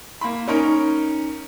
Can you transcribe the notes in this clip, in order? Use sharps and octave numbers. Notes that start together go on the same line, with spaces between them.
A#3 B5
C#4 D#4 A#4